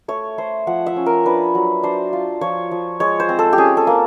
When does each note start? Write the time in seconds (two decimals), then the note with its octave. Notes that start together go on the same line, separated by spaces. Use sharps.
0.08 A3 C#5
0.38 A3 C5
0.67 F3 F#5
0.86 E5
0.96 C#4
1.06 A#4
1.26 D4 B4
1.55 F#3
1.83 D4 C5
2.13 F4
2.41 F3 C#5
2.71 F3
3.00 G#3 C#5
3.20 C5
3.29 C4
3.39 A4
3.53 G4
3.58 C#4 G#4
3.77 A4
3.87 A#3